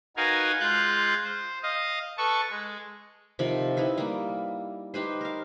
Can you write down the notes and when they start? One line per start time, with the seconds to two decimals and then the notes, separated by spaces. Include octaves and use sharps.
0.17 D#4 F#4 A#4 B4 F5 G#5
0.60 G#3 F4 F5 F#6 G6
1.24 C5
1.63 D#5 F5
2.18 A4 B4 A5 C#6
2.50 G#3
3.39 C3 D#3 F3 B5
3.77 D#4 E4 B4 E5
3.98 G3 A#3
4.94 D#4 G4 B4 C5
5.21 A#4 F5